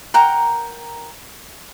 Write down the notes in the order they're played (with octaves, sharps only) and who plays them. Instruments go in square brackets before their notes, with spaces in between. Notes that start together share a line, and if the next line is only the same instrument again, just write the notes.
[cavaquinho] A#4 F#5 G5 A#5